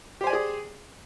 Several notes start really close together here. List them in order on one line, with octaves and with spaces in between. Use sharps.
G4 C5 G#5 D5 G#4